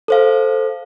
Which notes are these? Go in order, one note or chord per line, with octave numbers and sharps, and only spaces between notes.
A4 C5 F5